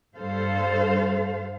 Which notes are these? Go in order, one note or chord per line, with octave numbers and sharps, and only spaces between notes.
G2 A4 C5 F5